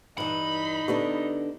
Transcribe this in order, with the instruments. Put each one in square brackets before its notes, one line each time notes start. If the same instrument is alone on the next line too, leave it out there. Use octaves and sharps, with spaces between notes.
[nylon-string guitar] G2 E3 [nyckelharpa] D#4 [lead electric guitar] B5
[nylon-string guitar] D3 B3 D4 [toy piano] G4